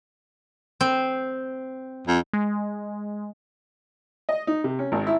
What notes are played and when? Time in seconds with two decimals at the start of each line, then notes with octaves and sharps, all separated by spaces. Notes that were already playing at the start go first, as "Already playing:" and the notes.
0.81 C4
2.07 F2
2.33 G#3
4.29 D#5
4.47 D#4
4.64 C3
4.79 C#4
4.92 G#1
5.07 E4